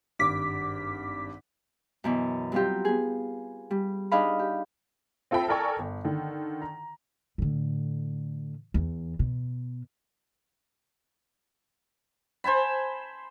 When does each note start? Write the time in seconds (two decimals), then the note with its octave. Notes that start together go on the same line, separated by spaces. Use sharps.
0.19 G#1 G2 D6 B6
2.04 F#2 B2 E3
2.52 F#3 G3 C4 F4 G4
2.85 B3 G#4
3.71 G3
4.12 D4 D#4 G#4 D#5 F5 B5
4.39 G4
5.31 C4 F4 A4 E5 G5 B5
5.48 A4 A#4 D5 G5 G#5 C#6
5.79 G1
6.04 D3 D#3
6.62 A#5
7.38 A2 D3
8.74 E2
9.19 B2
12.44 C5 G#5 A5 B5